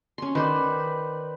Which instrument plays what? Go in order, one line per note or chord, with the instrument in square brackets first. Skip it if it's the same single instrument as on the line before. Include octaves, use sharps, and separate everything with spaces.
[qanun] C#4 C6
[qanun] D#3 C5 [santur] B4 D5